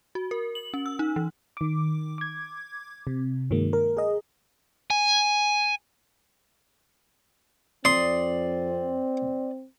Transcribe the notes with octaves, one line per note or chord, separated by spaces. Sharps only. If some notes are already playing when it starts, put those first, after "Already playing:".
F#4
A#4
F#7
C#4
E6
D#4
E3
D#3 D6
D6 G#6
C3
G2 D#3 F#3 G#3 A#3
A#4
G#4 D#5
G#5
F2 C4 D5 C6 D#6